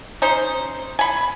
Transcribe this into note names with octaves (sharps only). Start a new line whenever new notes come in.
C#4 D#4 C5
G#5 B5